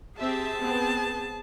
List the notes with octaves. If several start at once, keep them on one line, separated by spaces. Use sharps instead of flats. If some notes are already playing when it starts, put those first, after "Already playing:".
C4 G4 G#4 E5 A5
B3 C4